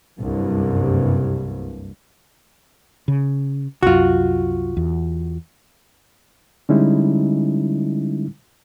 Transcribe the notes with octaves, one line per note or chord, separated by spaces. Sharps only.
F#1 C2 G2
C#3
C2 F#2 F4 F#4
E2
D3 G3 G#3 C#4 D#4 E4